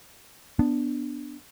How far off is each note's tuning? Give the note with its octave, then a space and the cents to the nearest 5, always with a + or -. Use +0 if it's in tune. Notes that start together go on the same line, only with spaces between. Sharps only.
B3 +0 D4 +0